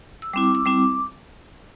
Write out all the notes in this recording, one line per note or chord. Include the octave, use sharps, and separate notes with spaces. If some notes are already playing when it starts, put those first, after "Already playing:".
E6
G3 C4 E4 D6
D6
E6
G3 C4 E4 D6